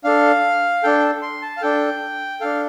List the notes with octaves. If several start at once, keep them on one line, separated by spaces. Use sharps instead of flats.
D4 A4 F5
D4 A4 G5
C6
A5
F5
D4 A4 G5
D4 A4 F5